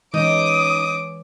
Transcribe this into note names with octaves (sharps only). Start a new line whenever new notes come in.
E3 G#3 C#4 D#4 D6 D#6